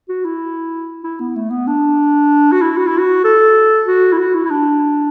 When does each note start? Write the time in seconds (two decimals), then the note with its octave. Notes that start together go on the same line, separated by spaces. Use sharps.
0.09 F#4
0.24 E4
1.04 E4
1.20 B3
1.36 A3
1.50 B3
1.67 D4
2.52 F#4
2.61 E4
2.77 F#4
2.87 E4
2.98 F#4
3.24 A4
3.87 F#4
4.12 E4
4.18 F#4
4.34 E4
4.44 E4
4.50 D4